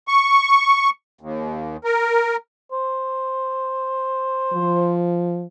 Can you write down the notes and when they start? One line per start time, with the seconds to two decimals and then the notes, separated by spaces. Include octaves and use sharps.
0.08 C#6
1.21 D#2
1.84 A#4
2.72 C5
4.53 F3